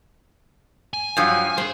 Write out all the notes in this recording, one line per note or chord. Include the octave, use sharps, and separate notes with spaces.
G#5
G2 F3 F#3
G3 G#4 C5